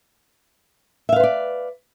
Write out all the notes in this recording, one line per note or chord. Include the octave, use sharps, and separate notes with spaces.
B4 C5 D5 E5 F5